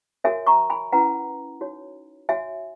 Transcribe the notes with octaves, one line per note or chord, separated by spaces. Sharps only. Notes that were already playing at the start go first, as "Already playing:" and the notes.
F#4 A#4 C#5 E5 G#5
A#5 C#6
G#5 B5
C#4 E4 B4 F#5 A#5
D#4 F#4 C#5
F#4 C#5 E5 G#5